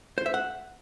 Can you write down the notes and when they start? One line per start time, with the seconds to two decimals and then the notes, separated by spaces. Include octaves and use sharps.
0.18 C5
0.26 E5
0.34 F#5